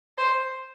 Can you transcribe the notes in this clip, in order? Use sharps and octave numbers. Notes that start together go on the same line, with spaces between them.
C5